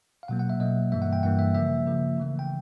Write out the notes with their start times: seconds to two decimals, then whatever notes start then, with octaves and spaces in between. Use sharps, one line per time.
0.23 F5
0.28 B2 F#3 A#3 F#5
0.39 F#5
0.50 E5
0.60 B2 F#3 A#3 D#5
0.92 G2 E3 G3 A#3 E5
1.02 F#5
1.13 G5
1.23 G2 E3 G3 A#3 F#5
1.39 E5
1.55 C#3 F3 A#3 E5
1.86 C#3 F3 A#3
2.18 C#3 E3 A3
2.39 G5